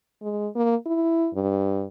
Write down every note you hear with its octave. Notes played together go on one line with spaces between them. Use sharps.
G#3
A#3
E4
G2